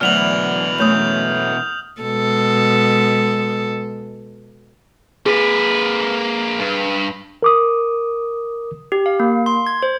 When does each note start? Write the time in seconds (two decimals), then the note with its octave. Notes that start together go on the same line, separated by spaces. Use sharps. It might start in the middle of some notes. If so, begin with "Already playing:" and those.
0.01 D2 B2 E3 F#3 D5 F6 F7 F#7
0.78 F#2 A3 C#4 D#6 G6 F7
2.02 B2 G#3 A4
5.26 A#3 G#4 B4
6.59 G2
7.43 A#4 D6 D#6
8.92 G4
9.06 F5
9.20 A#3
9.46 C6
9.67 G#6
9.83 C5